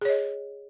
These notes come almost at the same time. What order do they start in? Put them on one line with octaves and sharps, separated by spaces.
G#4 C#5 D#5